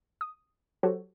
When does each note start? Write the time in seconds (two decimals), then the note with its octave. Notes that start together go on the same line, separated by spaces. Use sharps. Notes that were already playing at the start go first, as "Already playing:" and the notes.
0.21 D#6
0.83 F#3 F#4 G4 A4 C5 C#5